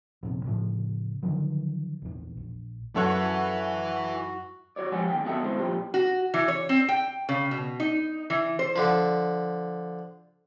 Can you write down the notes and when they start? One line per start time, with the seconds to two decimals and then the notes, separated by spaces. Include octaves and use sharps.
0.23 D#1 A#1 C3
0.46 A2 C#3 F3
1.23 D3 D#3 F3 F#3
2.02 A#1 E2
2.37 A#1
2.96 F#2 E4 F#4 A4 B4 C#5 F#5
4.76 F#4 C#5 D5
4.92 F3 G#3 G4 F#5 G#5
5.08 D#2 C3 G#4 G5
5.26 B3 F#4 A4 D#5 E5 F#5
5.42 E3 G#3 B3 C4 E4 C5
5.59 A#2 F3 G3 G4
5.94 F#4
6.34 E3
6.48 C#5
6.69 C4
6.89 G5
7.29 C#3
7.51 B2
7.80 D#4
8.30 E3
8.59 C5
8.76 D3 F3